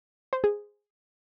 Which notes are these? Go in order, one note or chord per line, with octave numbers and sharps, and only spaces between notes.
C5
G#4